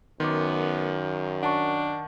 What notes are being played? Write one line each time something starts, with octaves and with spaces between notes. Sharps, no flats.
F#2 D#3 B3 C6 D6
D4 F#5 A5 C#6